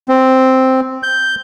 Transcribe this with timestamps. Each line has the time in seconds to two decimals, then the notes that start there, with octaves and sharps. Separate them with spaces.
0.08 C4
1.03 G6